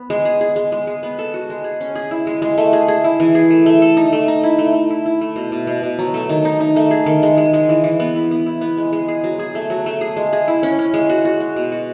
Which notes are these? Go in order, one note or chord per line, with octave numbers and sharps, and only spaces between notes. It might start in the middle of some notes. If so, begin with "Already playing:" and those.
Already playing: B3
G#3
G#4
G#4
G#3
G#3
G#3
B3
A4
F#4
G#3
G#4
C#4
G#4
E4
G#3
G#3
A3
G#4
G#4
E4
E3
G#4
A3
A3
A4
D#4
A3
D#4
E4
A3
A3
E4
E4
A3
B2
B2
B2
B2
F#3
A3
D#3
D#4
D#4
A3
G#4
D#3
G#3
G#3
G#3
E3
E3
B3
E4
B3
E4
B3
G#3
G#3
G#4
F#3
G#4
A3
F#3
A3
G#4
G#3
G#4
E4
C#4
C#4
G#3
F#4
F#4
G#3
B2
F#4